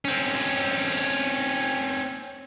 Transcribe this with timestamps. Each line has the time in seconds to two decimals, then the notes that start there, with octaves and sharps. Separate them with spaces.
0.05 C4 C#4